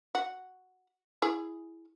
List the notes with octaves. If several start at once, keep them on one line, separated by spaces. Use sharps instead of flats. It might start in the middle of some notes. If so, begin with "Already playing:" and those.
F#4
E4 G#4 G#5